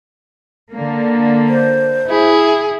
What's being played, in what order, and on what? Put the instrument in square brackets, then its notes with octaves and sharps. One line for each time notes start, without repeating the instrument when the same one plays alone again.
[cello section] D3 A#3
[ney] C5
[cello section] E4 [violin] G#4